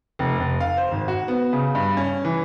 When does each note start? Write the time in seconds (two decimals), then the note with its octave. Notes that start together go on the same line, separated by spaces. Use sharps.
0.19 F1
0.40 F1
0.60 F5
0.77 C5
0.91 G#1
1.08 F#4
1.28 B3
1.53 C#3
1.75 G2
1.97 C#4
2.25 E3